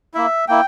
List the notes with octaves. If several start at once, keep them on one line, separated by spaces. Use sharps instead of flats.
A#3 E4 E5
A#3 E4 G5